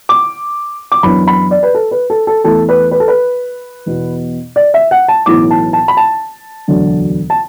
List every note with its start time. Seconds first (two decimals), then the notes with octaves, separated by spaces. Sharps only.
0.09 D6
0.92 D6
1.03 F#2 E3 B3 D4 B5
1.28 B5
1.51 D5
1.63 B4
1.75 A4
1.91 B4
2.10 A4
2.27 A4
2.44 E2 E3 A3 A4
2.69 B4
2.91 B4
3.00 A4
3.08 B4
3.86 E2 B2 B3
4.56 D5
4.74 E5
4.91 F#5
5.08 A5
5.26 B1 A2 E3 D6
5.51 A5
5.73 A5
5.88 B5
5.97 A5
6.68 E1 D2 D3 F#3 D4
7.30 A5